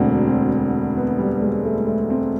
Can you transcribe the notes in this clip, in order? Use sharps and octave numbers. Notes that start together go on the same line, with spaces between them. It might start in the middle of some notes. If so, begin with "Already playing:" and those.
Already playing: E1 D2 D3 F#3 C4
C4
B3
G3
G#3
A3
A3
C4